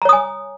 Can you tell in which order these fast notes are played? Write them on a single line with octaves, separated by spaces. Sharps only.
A#5 C#5 D#6 G#5